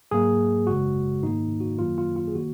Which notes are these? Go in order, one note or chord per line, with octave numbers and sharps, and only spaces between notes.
G#2 F#3 A#3 G#4
G#1 F#2 C#3 G#3 F#4
G#2 D#3 A#3 D#4
F#4
F#2 D#3 F#3 A#3 F4
F4
F4
G#4
D#3 A#3 F#4